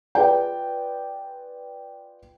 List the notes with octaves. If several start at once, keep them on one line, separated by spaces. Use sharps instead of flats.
F4 G#4 B4 D5 G5